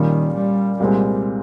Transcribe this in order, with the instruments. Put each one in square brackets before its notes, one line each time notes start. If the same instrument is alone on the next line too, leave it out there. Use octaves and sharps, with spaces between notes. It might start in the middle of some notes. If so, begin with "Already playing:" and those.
Already playing: [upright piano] A#2 G3 C#4 [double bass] D#3
[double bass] G3
[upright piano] C2 A#2 G#3 C4 [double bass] G3